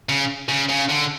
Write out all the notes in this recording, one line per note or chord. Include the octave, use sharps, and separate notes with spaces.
C#3
C#3
C#3
D3